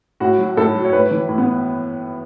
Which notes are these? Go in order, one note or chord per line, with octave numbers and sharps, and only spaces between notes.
A2 F#4
F#3
A2 A4
F#3
C#5
A2 B4
E3
A2
B3